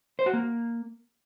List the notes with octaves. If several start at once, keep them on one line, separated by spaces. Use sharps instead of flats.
C5
F#4
A#3